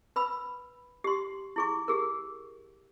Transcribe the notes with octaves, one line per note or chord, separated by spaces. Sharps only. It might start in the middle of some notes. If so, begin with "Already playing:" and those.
B4 B5 E6
G4 C6
E4 G#4 C#6
G4 G#4 A#4